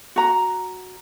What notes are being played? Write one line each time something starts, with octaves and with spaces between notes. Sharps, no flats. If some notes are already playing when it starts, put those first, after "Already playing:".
F#4 A#5